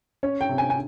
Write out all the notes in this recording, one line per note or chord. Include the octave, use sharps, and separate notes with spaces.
C#4 C#5
G5
C3
G#5
G#5